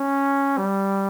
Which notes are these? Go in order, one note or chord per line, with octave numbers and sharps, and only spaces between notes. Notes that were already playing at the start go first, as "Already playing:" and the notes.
Already playing: C#4
G3